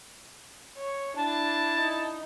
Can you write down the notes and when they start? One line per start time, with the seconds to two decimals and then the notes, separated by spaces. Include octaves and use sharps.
0.77 C#5
1.16 D4 E4 A5
1.80 D#4